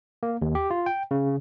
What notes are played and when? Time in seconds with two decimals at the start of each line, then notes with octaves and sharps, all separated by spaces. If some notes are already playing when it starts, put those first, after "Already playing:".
0.23 A#3
0.42 D#2
0.55 G4
0.71 F4
0.86 G5
1.11 C#3